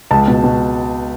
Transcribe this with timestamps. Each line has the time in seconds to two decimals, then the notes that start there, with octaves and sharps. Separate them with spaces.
0.11 C#2 A5
0.28 B2
0.44 B2